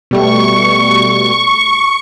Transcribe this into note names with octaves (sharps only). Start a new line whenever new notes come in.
B2 G3 A3 C#6